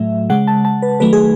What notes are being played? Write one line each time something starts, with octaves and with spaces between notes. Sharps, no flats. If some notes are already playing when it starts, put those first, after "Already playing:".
Already playing: A2 F#3 A3 E5
C#3 G#3 F#5
A5
A5
B4
D#3 F#3 A3 B4
G#4